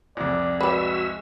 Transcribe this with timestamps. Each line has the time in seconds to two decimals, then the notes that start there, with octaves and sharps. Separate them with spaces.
0.17 C2 F2 D5
0.61 G#3 F#4 B4 D5 E5 E6